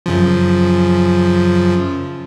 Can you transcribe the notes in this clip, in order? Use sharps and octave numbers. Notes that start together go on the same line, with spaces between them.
F#2 C#3 F3